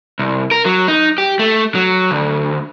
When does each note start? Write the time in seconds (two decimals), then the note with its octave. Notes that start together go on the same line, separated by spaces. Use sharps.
0.19 C2
0.51 A#4
0.66 F#3
0.88 D#4
1.18 G4
1.39 A3
1.75 F#3
2.11 D2